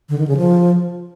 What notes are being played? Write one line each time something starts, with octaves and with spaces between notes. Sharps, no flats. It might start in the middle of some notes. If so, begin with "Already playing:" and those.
D3
D#3
C#3
F3